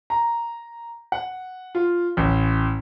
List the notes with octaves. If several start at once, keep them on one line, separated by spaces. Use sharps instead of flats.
A#5
F#5
F4
A1